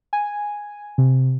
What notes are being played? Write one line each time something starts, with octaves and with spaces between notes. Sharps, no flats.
G#5
C3